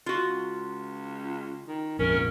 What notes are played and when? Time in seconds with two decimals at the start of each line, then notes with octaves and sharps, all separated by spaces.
0.06 F4 F#4
0.23 C#2
1.67 D#3
1.99 A#1 F2 G#2 C#4 A#4